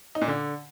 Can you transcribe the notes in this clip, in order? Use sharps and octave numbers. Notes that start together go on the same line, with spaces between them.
D#4
A#2
D3